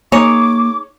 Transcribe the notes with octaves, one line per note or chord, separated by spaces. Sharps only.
A#3 D#4 G#4 C#5 D6